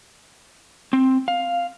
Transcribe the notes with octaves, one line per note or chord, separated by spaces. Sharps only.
C4
F5